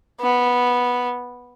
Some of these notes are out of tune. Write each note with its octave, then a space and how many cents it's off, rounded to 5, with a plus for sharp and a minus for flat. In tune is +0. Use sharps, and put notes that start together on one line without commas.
B3 -10